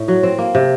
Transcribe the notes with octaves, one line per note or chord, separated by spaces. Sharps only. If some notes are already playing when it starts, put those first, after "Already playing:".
Already playing: A2 D#4
F#3
C4
A#3
C3